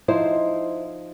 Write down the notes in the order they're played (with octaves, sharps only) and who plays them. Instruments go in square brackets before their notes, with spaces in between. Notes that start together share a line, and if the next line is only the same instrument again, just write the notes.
[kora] F3 D#4 [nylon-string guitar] E4 C5